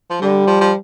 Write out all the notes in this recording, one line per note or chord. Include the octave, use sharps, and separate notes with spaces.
F3
D3 G3
F3
F3